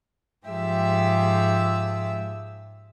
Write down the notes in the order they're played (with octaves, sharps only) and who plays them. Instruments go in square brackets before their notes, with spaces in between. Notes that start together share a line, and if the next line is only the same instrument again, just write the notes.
[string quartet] G#2 F3 G4 G#4 E5 E6